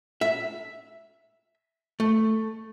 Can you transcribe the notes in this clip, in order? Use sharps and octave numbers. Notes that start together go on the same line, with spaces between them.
E5
A3